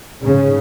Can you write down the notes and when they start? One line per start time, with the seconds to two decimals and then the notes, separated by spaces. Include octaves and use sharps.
0.21 G#2 C#3